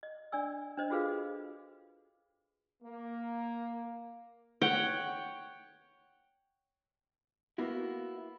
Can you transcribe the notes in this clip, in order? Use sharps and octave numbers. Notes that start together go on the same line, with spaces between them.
D#5
D4 D5 G#5 E6
D4 C5 D#5
F4 F#4 G#4 A4 B4 F5
A#3
C#5 F#5 G5
A#3 B3 E4 F#4